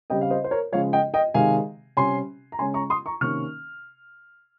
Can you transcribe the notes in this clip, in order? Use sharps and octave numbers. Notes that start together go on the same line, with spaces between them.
C#3 G3 C4 D#5 G5
F5
C5 D#5
C5
A#4 C#5
C#3 F3 G#3 C#5 F5
D#5 G5
D#5 G5
C3 D#3 G#3 F5 G#5
C3 G3 C#4 G#5 C6
A#5
C#3 G#3 C#4 G#5 C6
A#5 C#6
C6 D#6
A#5 C#6
C3 D#3 A#3 C#4 C#6 F6